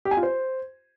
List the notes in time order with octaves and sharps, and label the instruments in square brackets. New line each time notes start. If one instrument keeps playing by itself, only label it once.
[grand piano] G4
G#5
F4
C5